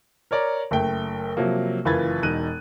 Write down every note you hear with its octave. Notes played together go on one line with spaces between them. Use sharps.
A#4 C#5 D5 A#5
F#1 A3 G5
C3 F3 F#3 A#3
F#1 E3 F4 B4 G#6 A6
E1 D#4 F#6 D#7